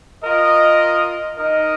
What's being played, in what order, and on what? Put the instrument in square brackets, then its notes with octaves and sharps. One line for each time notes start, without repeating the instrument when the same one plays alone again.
[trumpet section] F4 A#4 D#5
D#4 A#4 D#5